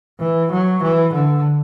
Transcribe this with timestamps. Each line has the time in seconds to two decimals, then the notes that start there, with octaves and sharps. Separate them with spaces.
0.19 E3
0.51 F#3
0.83 E3
1.13 D3